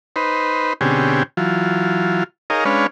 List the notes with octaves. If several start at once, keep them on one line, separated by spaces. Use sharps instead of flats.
D#4 B4 C5
B2 D3 C4 C#4 G4 G#4
E3 F#3 F4
D#4 G#4 A#4 C#5 D#5 F5
G#3 C#4 D4 B4 C#5 F5